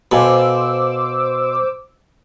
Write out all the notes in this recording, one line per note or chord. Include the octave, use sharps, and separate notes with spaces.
B2 A4 C5 F5 G#5 D6 E6